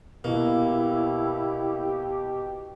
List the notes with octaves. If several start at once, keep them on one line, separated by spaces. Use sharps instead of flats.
B2 A#3 E4 G4